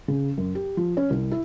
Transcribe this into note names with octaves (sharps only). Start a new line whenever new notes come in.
C#3
F#2
G4
F3
C#4
C2
E4